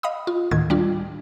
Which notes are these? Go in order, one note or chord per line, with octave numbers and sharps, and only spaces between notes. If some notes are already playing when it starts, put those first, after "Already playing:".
D#5 F5 B5 D#6
F4
D2 A2 D#3 G#6
G3 D4 F4